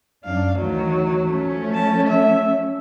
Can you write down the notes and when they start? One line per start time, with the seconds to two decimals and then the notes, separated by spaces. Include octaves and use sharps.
0.25 F#2 D4 F5
0.59 D2 D#3 E3 F#3
1.24 F3 A3 C#4
1.75 A5
2.07 E5